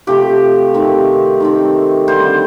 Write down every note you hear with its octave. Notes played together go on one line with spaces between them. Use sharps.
C3 F3 A3 C4 G4
C3 D#3 A3 C4
D#3 A3 C4
D3 G3 C4 C5